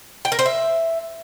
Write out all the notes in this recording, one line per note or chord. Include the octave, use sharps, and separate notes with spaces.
G5
A#4
C5
E5